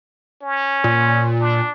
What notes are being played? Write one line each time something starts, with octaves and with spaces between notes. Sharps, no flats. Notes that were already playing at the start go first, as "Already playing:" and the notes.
C#4
A#2
D4